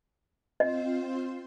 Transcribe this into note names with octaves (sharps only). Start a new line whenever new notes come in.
C4 F4 C5 D#5